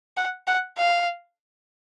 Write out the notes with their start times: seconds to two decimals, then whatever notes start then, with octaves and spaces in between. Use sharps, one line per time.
0.17 F#5
0.47 F#5
0.77 F5